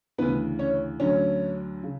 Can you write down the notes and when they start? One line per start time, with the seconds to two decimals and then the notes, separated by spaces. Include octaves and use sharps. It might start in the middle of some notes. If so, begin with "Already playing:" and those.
0.18 D2 C#3 E3 B3 B4
0.59 C#4 C#5
0.99 D2 D3 F#3 C#4 C#5
1.83 C#3